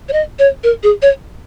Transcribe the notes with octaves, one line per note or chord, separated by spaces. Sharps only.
C#5
D#5
C#5
A#4
G#4
C#5